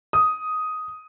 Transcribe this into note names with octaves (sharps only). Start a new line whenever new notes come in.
D#6